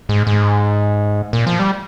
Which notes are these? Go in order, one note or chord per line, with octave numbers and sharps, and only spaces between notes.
G#2
G#2
A#2
F3
G3